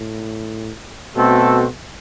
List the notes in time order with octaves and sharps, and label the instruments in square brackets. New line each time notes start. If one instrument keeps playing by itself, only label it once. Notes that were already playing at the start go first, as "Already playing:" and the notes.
Already playing: [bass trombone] A2
[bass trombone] B2 [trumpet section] A3 C4 F#4 A4